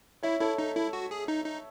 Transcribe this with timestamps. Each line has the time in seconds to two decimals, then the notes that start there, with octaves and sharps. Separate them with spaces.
0.23 E4 C#5 E5
0.41 E4 A4 C#5
0.58 D#4 A4
0.75 E4 A4
0.93 F#4
1.11 G#4
1.28 D#4
1.45 D#4